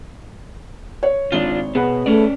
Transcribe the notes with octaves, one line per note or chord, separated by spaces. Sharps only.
C#5
G#1 D4 F4 G7
B2 B3 G#4 B4 F#5
A3 C#4 D5